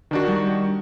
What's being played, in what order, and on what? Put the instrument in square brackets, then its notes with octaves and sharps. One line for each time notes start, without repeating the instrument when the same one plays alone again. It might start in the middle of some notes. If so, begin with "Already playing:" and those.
[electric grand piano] D#3 D4 F#4
[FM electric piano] G3